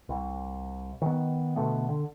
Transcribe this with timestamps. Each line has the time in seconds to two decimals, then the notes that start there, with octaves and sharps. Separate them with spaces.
0.09 C2
1.01 D#3 B3
1.56 B2 D3 A3 B3
1.89 D3